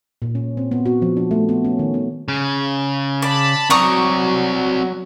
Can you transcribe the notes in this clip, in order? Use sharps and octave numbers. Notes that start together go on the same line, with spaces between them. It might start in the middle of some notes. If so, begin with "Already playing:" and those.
A#2
C#4
C4
B3
F#4
F3
D4
A3
B3
C#4
D#3
B3
C#3
D5 A5 B5
F#3 C4 D5 A#5 C#6 D#6